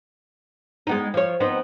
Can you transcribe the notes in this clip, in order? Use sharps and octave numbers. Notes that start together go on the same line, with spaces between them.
G#3 B3 D#4
F3 C#5
B3 C4 D#4